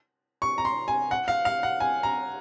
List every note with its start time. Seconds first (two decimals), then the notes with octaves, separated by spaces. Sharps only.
0.42 C#6
0.58 A#5
0.65 C6
0.88 G#5
1.11 F#5
1.28 F5
1.45 F5
1.63 F#5
1.80 G#5
2.03 A#5